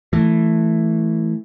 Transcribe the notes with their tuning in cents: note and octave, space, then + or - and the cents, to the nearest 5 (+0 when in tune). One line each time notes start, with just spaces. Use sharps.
E3 +0 A3 +0